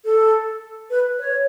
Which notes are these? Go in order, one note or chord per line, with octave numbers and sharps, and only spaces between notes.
A4
B4
C#5